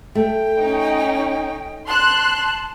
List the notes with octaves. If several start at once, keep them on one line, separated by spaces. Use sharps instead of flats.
A3 G5
C#4 D#4
A5 C6 F#6